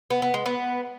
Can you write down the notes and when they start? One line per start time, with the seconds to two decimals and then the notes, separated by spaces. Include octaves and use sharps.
0.10 B3
0.22 B3
0.34 G#3
0.46 B3